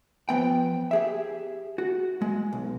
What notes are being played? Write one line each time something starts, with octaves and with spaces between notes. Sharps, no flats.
F3 B3 G5
G4 G#4 E5
F#4
G#3
B1